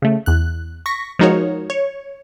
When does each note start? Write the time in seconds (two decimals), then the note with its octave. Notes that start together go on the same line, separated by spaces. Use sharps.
0.02 C#3 A3
0.26 E2 F#6
0.86 C#6 A#6 B6
1.19 F3 G#3 D#4 F#4 A#4 C#5
1.70 C#5